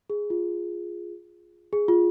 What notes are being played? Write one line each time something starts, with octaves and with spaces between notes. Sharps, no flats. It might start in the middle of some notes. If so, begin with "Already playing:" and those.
G#4
F4
G#4
F4